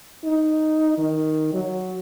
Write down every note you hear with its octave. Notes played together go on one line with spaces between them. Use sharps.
D#4
D#3
F#3